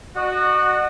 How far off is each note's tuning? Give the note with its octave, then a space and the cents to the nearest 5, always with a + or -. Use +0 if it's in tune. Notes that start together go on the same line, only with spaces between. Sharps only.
F#4 +0 D#5 -40